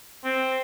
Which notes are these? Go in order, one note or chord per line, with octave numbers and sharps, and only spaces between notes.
C4